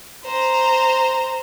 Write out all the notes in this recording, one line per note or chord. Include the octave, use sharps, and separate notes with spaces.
C5 A#5